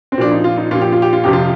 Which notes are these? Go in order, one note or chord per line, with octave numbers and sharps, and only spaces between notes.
C4
A#2 F3 D4
D#4
F4
D#4
A#2 F3 F4
G4
F4
G4
F4
F2 C3 F3 G4
F4